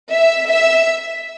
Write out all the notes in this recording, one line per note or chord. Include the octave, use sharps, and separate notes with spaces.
E5
E5